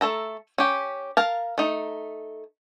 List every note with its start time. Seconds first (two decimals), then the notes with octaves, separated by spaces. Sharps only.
0.01 A3 A4 A#5
0.58 C#4 G4
1.17 A#4 F5 A5
1.58 A3 D#4